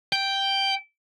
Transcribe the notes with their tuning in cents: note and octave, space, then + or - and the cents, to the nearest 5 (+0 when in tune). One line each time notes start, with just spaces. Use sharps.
G5 +0